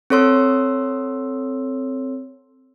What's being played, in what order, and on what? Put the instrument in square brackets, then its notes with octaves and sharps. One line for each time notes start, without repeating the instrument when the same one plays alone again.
[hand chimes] C4 A4 C#5 C6 E6